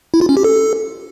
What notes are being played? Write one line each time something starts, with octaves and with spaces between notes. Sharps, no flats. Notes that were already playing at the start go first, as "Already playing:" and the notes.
E4
F4
C#4
G4
A4